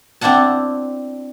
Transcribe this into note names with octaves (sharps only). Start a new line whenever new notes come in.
C4 D4 E4 F#5 A5